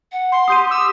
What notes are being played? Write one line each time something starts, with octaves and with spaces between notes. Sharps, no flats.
F#5
C6
G4 D#6 G6 D#7
E6